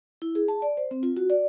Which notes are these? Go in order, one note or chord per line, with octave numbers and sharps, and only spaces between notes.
E4
G#4
A5
D5
C5
C4
F4
F#4
D5